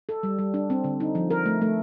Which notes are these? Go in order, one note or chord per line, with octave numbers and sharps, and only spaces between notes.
A4
G3
G3
D4
C4
D3
D#4
F3
A#4
A3
A3